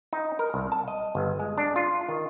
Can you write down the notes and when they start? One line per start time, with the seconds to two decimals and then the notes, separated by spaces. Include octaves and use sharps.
0.13 D#4
0.39 A#4
0.54 C2
0.72 A5
0.88 D#5
1.15 G1
1.39 G#3
1.58 D4
1.76 F4
2.09 D#3